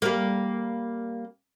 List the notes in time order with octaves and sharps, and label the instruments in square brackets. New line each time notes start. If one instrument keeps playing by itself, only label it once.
[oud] G3 A#3